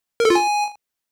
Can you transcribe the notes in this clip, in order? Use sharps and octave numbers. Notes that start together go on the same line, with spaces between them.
A#4
A4
F4
G#5